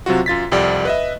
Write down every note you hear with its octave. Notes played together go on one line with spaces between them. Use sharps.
C3 F#3 F4 F#4
F#2 F4 A6 B6
C2 F2 G4 D5
B4 D#5 E5